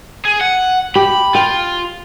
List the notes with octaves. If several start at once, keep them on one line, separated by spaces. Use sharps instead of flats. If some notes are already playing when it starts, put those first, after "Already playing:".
G#4
F#5
G4 B5
F4 G5